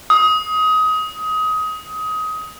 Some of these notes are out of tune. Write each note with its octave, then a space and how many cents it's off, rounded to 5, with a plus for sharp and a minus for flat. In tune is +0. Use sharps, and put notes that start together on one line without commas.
D#6 +20